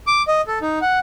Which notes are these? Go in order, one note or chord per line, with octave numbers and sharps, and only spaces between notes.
D6
D#5
A4
D#4
F#5